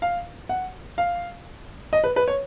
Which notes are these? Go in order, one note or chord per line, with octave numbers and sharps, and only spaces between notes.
F5
F#5
F5
D#5
B4
B4
C#5